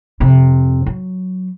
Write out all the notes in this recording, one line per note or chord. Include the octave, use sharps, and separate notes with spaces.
F2 C3
F#3